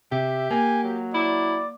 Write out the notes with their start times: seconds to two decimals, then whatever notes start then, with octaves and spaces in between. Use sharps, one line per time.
0.12 C3 G4 E5
0.51 A#3 G#5
0.83 F#3
1.14 E4 D5